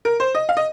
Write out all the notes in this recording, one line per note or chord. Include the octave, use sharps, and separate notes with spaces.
A#4
C5
D#5
F5
D#5